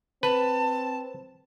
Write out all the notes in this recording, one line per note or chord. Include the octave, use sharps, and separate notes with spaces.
C4 B4 A5